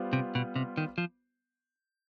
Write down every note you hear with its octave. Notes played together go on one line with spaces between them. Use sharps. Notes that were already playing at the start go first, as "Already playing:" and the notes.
Already playing: G3 B3 F4 C5
C3
B2
C3
D#3
F3